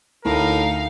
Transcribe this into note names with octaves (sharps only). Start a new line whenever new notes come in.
D2 A2 D#4 A#4 F5